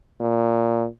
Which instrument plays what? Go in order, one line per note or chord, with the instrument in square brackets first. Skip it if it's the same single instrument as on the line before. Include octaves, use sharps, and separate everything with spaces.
[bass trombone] A#2